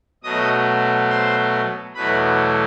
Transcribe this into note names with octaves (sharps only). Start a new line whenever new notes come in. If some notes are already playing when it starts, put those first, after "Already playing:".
B2 F#3 A3 D#5 D#6
C5 C6
E2 B2 F#3 A3 B4 B5